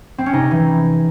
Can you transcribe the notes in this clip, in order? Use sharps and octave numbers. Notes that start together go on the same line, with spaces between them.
C4
C#4
C3 D#4
E3